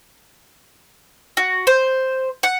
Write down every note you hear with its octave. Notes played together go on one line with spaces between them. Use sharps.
F#4
C5
F#5